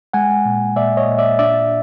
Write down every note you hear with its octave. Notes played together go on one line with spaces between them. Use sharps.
G#3 F#5 G#5
A#2
A#2 D5 E5
C#5 D#5
A#2
D5 E5
D4 D5 E5